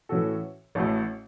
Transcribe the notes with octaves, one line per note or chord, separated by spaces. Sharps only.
A2 E3 C#4 F#4 A4
A1 A2 A3 F#4